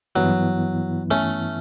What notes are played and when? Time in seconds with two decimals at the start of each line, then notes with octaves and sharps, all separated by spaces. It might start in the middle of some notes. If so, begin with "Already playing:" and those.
0.16 G2 E3 F#3 B3 E4
1.11 A3 C#4